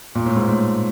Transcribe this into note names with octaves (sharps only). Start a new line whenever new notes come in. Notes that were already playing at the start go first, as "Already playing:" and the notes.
A#2
A2
G#2
A2